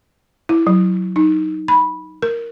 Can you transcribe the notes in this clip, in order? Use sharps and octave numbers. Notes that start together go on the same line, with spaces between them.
E4
F#3
D#4
B5
A#4